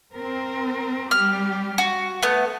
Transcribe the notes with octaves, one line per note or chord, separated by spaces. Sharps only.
C4 A#4
G3 G4 F6
F#4
A3 B3 A4